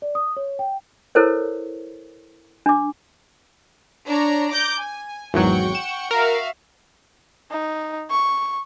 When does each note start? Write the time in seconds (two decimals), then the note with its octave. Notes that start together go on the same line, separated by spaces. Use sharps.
0.02 D5
0.15 D#6
0.37 C#5
0.59 G5
1.15 E4 A4 A#4 C5 C#5
2.66 D4 D6
4.06 D4 C#5 A#5
4.49 A#5 D6 G6
4.79 G#5
5.34 G#1 E2 F#3 F#5 G5 C#6
5.75 E7
6.11 F#4 A#4 E5 F5
7.51 D#4
8.10 C#6